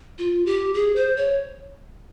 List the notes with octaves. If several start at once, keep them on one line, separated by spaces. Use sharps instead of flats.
F4
G4
G#4
C5
C#5